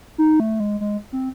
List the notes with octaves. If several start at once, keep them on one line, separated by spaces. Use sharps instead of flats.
D#4
A3
G#3
G#3
C4